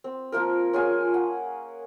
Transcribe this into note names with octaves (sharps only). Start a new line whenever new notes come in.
C4
F3 A#3 F4 A#4
C#4 F4 G#4 G#5
F#5